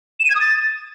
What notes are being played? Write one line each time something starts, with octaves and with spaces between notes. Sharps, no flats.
E7
D#7
G#6
D#6
A6